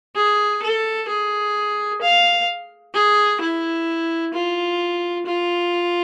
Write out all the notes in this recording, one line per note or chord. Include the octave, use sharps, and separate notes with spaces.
G#4
A4
G#4
F5
G#4
E4
F4
F4